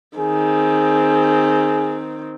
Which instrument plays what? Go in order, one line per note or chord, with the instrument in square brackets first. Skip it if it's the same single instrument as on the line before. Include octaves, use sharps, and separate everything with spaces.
[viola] D#3 C4 [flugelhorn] G#4